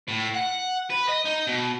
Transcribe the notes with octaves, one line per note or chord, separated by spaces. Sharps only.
A2
F#5
B4
D#5
D#4
B2